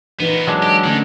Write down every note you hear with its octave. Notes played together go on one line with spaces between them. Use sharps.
A#2 E3 B3 D#4 B4
F#3 G#3 D4
G4
D3 D#3 A3 C#4